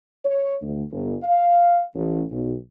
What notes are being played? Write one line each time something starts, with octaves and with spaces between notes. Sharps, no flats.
C#5
D2
G1
F5
A1
B1